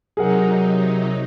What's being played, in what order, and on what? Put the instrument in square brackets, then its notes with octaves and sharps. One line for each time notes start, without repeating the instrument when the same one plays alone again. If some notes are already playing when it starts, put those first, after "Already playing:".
[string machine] C3 F#3 D#4 [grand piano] G#4 A#4 F#5